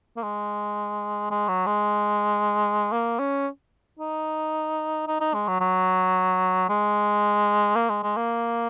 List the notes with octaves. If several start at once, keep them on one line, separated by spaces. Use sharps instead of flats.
A#3
G#3
G#3
F#3
G#3
A#3
C#4
D#4
D#4
D#4
G#3
F#3
F#3
G#3
A#3
G#3
G#3
A#3